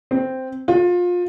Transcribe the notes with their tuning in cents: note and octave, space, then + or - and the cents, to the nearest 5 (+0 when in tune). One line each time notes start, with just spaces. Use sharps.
C4 -5
F4 +25